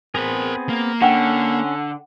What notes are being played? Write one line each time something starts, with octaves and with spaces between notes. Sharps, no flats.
B3 C4 G#4 A#4 C5
A#3
D3 C#4 F#5 G5